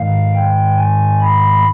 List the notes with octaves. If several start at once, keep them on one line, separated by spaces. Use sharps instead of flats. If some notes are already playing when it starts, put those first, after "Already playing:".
Already playing: G#2 D#3 G#3 F5
G5
G#5
B5